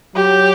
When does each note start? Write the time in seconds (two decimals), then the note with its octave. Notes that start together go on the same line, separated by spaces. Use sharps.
0.16 F#3 G4